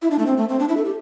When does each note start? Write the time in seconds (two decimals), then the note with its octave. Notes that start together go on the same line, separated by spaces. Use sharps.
0.02 E4
0.11 D4
0.19 A3
0.26 C4
0.37 A3
0.49 C4
0.59 D4
0.69 E4
0.77 A4
0.85 G4